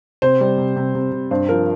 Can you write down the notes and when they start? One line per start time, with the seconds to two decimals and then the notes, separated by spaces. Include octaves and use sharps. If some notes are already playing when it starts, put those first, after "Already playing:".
0.22 C3 C5
0.41 G3
0.58 C3
0.76 C3
0.95 C3
1.12 C3
1.31 G2 C5
1.49 F3 A#4